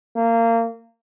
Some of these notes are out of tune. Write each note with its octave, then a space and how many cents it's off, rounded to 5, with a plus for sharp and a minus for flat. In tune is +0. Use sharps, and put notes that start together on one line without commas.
A#3 -25